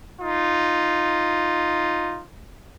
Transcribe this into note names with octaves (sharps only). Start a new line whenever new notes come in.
D#4 F4